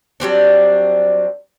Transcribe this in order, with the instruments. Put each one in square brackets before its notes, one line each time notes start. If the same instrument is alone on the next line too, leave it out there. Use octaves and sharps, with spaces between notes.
[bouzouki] F#3 G3 C4 D4